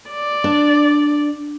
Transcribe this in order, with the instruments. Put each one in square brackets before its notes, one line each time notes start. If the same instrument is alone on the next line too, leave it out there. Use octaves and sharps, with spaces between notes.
[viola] D5
[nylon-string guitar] D4